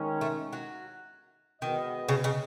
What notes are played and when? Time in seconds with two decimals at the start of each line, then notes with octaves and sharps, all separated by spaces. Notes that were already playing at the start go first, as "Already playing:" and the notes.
Already playing: D#3 G#3 C#4
0.21 A3
0.53 F#3
1.62 D#3 G#3 B3 F#4 B4 D#5
2.08 C#3
2.24 C#3